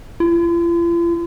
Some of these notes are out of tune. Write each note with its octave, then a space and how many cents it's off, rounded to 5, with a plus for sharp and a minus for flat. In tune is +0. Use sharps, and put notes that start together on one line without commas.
F4 -45